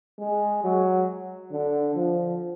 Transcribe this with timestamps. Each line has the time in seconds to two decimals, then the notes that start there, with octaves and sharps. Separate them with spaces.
0.20 G#3
0.64 F#3
1.51 D3
1.96 F3